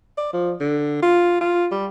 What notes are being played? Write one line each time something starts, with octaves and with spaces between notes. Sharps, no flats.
D5
F3
D3
F4
F4
G3